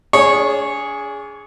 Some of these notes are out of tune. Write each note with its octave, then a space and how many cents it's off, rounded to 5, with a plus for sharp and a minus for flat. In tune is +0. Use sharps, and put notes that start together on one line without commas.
D4 -40 G#4 +0 C#5 -10